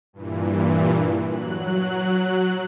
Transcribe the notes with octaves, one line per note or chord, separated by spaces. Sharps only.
G2 A#2 E3
F#3 F#6